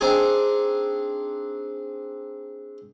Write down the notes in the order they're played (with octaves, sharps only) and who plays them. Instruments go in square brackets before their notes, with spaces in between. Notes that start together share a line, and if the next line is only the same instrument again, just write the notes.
[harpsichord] C4 D4 D#4 G#4